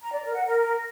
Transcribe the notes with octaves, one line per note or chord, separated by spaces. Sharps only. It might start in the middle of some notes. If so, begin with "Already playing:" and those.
A#5
D5
A#4
F#5
A#4